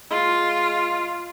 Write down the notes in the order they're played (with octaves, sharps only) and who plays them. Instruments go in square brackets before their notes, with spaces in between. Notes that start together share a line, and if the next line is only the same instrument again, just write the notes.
[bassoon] G#3 [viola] F4